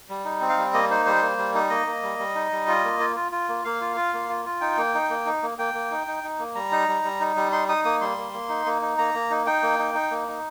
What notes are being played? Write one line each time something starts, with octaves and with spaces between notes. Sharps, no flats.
G3
D#4
C4
F5
G3
A#3 D#5
D#4 C5
G3 C5
A#3
G3
D#4
A#3 D#5
A#3
G3
G3
D#4
G3
F4
A#3
F4
F4
F4
A#3
A#3 F5
F4
F4
A#3
F4
F4
D#4 G5
A#3
D#4
A#3
D#4
A#3
A#3 G5
A#3
D#4
D#4
D#4
A#3
G3 A#5
D#4
G3
G3
D#4
G3
D#4 C6
D#4 D#6
A#3 D#6
G3 C6
A#3
A#3
D#4
A#3
D#4
A#3 A#5
A#3
D#4
D#4 G5
A#3
D#4
D#4
A#3
D#4